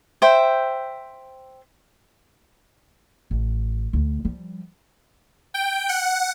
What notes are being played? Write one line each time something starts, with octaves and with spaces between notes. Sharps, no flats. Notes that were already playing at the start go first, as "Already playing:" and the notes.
C5 E5 G5
A1
D2
F3 G3
G5
F#5